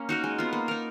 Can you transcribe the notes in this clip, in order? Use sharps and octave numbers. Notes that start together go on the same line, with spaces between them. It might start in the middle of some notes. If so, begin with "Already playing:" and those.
Already playing: A#3 C#4
D#4 F#4 A#4
G#3
B3 F4
A#3
D#4 A#4